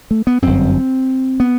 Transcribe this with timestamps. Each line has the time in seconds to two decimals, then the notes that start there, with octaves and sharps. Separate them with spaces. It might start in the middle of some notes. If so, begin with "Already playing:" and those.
0.11 A3
0.27 B3
0.42 G1 F#2 C4
1.40 B3